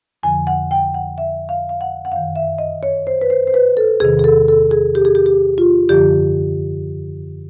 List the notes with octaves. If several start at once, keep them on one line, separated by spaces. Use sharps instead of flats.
F2 D3 F3 G#5
F#5
G5
F#5
E5
F5
F5
F#5
F#5
F#2 D#3 F5
E5
D#5
C#5
C5
B4
C5
C5
B4
A4
E2 C3 D#3 G#4
G#4
A4
A4
G#4
G4
G#4
G4
G4
F4
F#2 D3 F3 G4